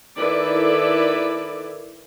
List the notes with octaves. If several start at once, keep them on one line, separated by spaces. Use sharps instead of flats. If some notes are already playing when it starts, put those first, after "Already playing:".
D#3 E4 A4 B4 D5